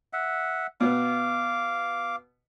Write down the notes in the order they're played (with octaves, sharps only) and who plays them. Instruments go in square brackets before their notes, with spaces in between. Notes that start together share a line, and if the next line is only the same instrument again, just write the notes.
[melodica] E5 F#5
[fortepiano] B2 B3 [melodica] F5 D6